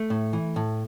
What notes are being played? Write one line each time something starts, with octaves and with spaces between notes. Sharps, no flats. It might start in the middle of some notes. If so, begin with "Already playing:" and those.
Already playing: A3
A2
E3
A2